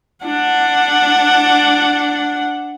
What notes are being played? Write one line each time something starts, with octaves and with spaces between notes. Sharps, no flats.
D4 F#5